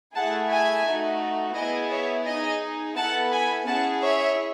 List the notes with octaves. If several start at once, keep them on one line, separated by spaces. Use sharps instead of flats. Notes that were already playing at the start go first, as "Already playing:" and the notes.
A3 E4 G#4 F#5 A5
E5 G#5
A3 D#4 F#4
B3 E4 G#4 D#5
C#5 E5
D#4 G#4 D#5
B3 E4 A4 F#5 A5
G#5 B5
C#4 E4 G#4 F#5 A5
C#5 E5